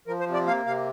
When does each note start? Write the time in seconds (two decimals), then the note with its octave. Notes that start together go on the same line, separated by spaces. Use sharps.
0.07 F3 A#4
0.20 C5
0.27 C3
0.33 D5
0.46 A#3 F5
0.66 C3 F5